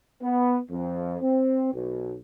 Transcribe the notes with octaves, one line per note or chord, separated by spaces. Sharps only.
B3
F2
C4
B1